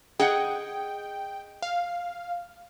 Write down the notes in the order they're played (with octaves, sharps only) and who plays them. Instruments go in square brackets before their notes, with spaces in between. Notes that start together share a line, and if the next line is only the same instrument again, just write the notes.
[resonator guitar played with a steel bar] G#4 D#5 F#5 [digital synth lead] G5
[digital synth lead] F5